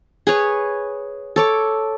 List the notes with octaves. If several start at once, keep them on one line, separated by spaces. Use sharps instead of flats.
G#4 B4 C#5
A4 C#5 D6